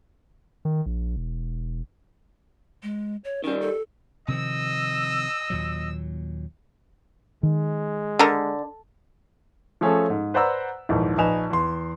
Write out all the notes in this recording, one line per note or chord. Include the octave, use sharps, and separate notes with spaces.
D#3
A#1
E1
G#3
C#5
D#3 G3 C#4
A4
C3 D#3 F3 D#5 E6
D#2 A#2 F#3
D#3 G#3
D3 A4 A#4
F3 A3 C#4 G#4 A4
G#2
B4 C5 D5 F#5 A#5 E6
A#1 D#2 G#2 D#3 E3
A#1 D#4 B4 G#5 E7 F7
E2 C6